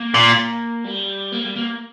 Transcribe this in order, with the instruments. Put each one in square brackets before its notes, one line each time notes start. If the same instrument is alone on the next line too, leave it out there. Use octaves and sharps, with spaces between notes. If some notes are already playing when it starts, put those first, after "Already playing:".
Already playing: [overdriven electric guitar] A#3
[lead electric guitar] A#2
[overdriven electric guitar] G3
A#3
G3
A#3